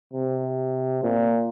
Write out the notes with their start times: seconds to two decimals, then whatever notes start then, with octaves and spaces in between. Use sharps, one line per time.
0.13 C3
1.03 A#2